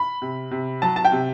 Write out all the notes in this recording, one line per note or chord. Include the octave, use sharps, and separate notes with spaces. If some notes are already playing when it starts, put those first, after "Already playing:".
Already playing: B5
C3
C3
F#3 A5
A5
G5
C3